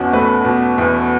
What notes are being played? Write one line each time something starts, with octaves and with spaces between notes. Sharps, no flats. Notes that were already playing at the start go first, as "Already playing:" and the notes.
Already playing: E2 B2 C#4 F#4
A3 B4
B2
E2